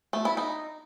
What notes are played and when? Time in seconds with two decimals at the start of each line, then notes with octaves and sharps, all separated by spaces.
0.13 A3
0.25 E4
0.37 D#4